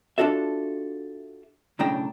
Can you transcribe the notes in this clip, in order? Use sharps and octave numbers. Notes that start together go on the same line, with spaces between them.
D4 F4 F#4 A4 E5
B1 A2 C#3 D4 G5 A#5